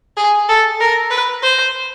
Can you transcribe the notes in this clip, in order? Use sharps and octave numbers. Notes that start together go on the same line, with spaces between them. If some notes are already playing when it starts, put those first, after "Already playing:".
G#4
A4
A#4
B4
C5